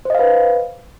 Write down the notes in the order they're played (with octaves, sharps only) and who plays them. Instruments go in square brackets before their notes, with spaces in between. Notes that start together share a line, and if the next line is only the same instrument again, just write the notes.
[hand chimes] C5
D#5
F5
B4